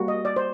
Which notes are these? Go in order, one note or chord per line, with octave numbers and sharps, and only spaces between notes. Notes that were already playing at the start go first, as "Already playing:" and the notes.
Already playing: G3 A#3 F#4
D#5
D5
C5